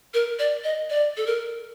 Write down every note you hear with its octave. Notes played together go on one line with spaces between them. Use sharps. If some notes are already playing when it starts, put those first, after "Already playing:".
A#4
D5
D#5
D5
A4
A#4